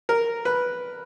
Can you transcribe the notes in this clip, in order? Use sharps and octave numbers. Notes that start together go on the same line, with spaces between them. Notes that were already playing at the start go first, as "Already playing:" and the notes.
A#4
B4